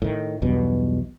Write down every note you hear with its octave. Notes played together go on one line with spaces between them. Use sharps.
A2 D#3
B1 E2 G2 B2